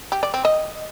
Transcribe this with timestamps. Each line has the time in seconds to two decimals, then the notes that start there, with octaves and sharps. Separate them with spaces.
0.12 G4
0.23 D5
0.34 C4
0.45 D#5